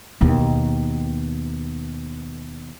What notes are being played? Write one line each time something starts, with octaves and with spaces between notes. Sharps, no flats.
D#2 B2